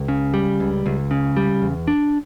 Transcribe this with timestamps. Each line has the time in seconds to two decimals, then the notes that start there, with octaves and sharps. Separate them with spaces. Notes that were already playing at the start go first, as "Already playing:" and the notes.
Already playing: C#2
0.08 C#3
0.34 G3
0.60 C#2
0.86 C#2
1.11 C#3
1.37 G3
1.62 E2
1.88 D4